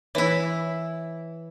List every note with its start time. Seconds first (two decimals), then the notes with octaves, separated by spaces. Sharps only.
0.15 E3 E4 C#5